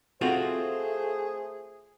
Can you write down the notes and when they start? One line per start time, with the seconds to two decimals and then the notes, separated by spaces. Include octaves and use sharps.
0.21 A3 C4 F4 F#4 G#4 C5